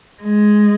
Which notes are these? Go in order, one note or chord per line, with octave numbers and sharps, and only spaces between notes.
G#3